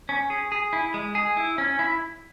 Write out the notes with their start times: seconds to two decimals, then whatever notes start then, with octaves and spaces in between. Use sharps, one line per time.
0.09 C#4
0.30 G#4
0.52 G#4
0.73 E4
0.94 G#3
1.15 G#4
1.37 E4
1.58 C#4
1.79 E4